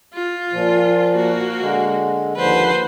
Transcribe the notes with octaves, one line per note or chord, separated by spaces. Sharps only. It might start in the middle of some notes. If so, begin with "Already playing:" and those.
F4
A#2 F3
A#3 F#4
D3 G#3
D#2 D3 F3 B4 C5